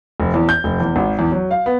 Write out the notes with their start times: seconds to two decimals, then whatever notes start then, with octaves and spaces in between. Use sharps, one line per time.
0.20 F1
0.34 E2
0.49 G6
0.64 F1
0.80 E2
0.96 G#1
1.19 E2
1.32 F#3
1.51 F5
1.66 B3